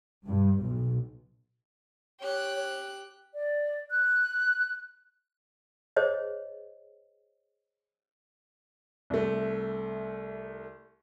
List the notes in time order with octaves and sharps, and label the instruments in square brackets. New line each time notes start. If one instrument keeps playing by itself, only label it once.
[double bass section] G2
B1
[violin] G4 F#6 [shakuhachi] C#5
[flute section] D5
F#6
[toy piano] G#4 C5 C#5 D#5
[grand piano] C2 A3